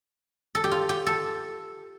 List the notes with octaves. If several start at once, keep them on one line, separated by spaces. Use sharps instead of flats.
A4
G4
F4
G4
A4